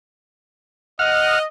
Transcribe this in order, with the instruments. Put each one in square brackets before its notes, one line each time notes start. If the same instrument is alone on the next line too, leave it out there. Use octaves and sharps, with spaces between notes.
[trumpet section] D#5 [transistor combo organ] F#5 F6